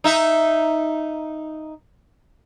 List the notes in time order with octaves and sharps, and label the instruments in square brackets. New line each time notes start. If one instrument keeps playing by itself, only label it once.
[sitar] D#4 E5